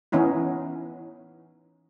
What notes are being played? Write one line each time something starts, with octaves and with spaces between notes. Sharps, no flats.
E3 B3 C#4 D#4 E4